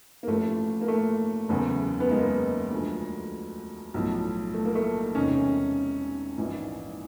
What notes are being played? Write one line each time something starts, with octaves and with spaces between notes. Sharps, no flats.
A#3
A1 A2 F3 A3
A#3
A3
F#1 E2 C#3
B3
G#3 A#3
D2 D3 F3
B1 A2 F3
A3
A#3
A3
E1 E2 C3 D#3 C#4 D#4
A#1 G#2 E3